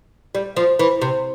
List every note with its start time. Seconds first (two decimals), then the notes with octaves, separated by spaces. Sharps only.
0.35 G3
0.57 F3
0.79 E3
1.01 C3